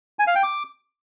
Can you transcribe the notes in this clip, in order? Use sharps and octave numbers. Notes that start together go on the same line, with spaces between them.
G#5
F5
G5
D6